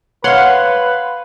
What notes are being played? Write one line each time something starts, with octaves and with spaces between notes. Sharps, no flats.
B4 C#5 F5 F#5 C6